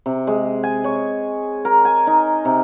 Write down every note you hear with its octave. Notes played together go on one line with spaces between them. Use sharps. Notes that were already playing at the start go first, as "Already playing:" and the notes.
C3
G#3
G#5
C#5
A#4
G#5
D#4
C3